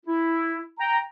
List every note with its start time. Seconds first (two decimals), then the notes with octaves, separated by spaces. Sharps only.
0.05 E4
0.80 G5 A#5